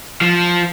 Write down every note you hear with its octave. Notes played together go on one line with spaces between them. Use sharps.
F3